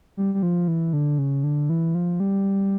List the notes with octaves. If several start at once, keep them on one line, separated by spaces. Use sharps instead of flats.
G3
G3
F3
E3
D3
C#3
D3
E3
F3
G3